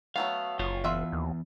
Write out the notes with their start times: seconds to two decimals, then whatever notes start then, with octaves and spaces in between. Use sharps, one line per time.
0.16 F#3 A3 B3 F5
0.59 F#1 F4 C#5
0.84 E2 F4 E5 F#5
1.12 D#2